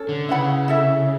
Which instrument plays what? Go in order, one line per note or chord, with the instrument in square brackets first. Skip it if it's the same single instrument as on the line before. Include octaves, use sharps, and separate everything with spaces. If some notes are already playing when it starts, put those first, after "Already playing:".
Already playing: [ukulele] C#4 A4
[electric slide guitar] D3
[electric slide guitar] C#3 [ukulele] E4 B4 F#5 B5
[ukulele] E4 A4 E5